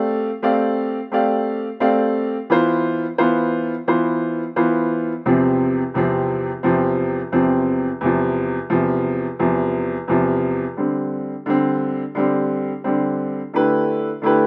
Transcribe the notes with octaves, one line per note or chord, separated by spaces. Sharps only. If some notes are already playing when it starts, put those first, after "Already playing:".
Already playing: A3 C4 G4 D5 F5
A3 C4 G4 D5 F5
A3 C4 G4 D5 F5
A3 C4 G4 D5 F5
E3 B3 F4 C5
E3 B3 F4 C5
E3 B3 F4 C5
E3 B3 F4 C5
E2 C3 F3 C4
E2 C3 F3 C4
E2 C3 F3 C4
E2 C3 F3 C4
E2 C3 F3
E2 C3 F3
E2 C3 F3
E2 C3 F3
D3 G3 C4
D3 G3 C4
D3 G3 C4
D3 G3 C4
D3 A3 E4 G4 B4
D3 A3 E4 G4 B4